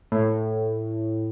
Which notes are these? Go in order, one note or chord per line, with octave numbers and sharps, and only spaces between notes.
A2